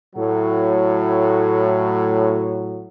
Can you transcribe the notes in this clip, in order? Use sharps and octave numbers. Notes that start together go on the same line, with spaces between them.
A2 F#3